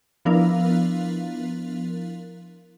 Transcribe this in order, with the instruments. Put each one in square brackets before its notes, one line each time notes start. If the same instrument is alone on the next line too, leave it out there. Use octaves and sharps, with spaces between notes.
[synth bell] F3 B3 D4 E4 A#4 F5